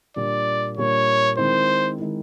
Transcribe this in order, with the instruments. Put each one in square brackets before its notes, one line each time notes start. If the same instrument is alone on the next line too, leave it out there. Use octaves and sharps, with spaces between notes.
[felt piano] A#2 G3 A#3 D4 [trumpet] D5
[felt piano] A#2 G3 A#3 D4 [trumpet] C#5
[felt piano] D#3 G#3 C4 E4 [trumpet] C5
[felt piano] D#3 G#3 C4 E4